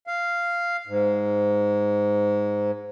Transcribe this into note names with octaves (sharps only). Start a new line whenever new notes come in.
F5
G#2